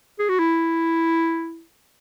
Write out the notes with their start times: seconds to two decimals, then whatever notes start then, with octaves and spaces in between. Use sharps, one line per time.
0.19 G#4
0.29 F#4
0.39 E4